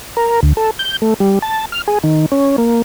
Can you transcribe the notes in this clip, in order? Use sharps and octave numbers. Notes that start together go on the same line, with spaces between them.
A#4
D2
A4
G6
A3
G3
A5
F6
G#4
D#3
C#4
A#3